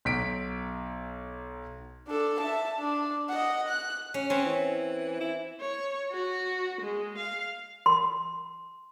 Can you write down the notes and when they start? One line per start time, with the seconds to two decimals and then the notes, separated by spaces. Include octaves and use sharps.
0.05 B1 B6 D7
2.07 D4 A4
2.41 E5 A5
2.79 D4
3.29 D#5 F#5
3.69 F#6
4.14 C#4
4.30 C4 C#4 B4
4.45 E3
5.20 E4
5.60 C#5
6.12 F#4
6.81 G#3
7.17 F5
7.86 C6